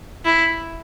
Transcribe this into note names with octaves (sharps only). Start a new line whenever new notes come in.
E4